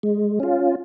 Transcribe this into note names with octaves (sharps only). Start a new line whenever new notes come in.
G#3
C#4 F4